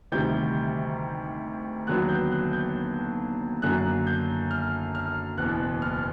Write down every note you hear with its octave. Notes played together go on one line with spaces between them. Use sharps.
D2 C3 D#3 G3 G6
D#2 D3 F#3 B3 F#6
G6
F#6
G6
F#2 D3 F#3 A#3 F#6
G6
F6
F6
F#1 E2 B2 F#6
F6